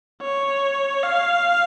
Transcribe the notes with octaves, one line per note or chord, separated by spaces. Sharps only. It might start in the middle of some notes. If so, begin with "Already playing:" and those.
C#5
F5